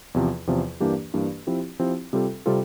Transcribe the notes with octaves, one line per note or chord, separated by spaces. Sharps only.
E2 C3 F3
E2 C3 F3
G2 E3 A#3 D4 G4
G2 E3 A#3 D4 G4
F3 C4 E4 G4
F3 C4 E4 G4
C3 G3 C4 F4 A4
C3 G3 C4 F4 A4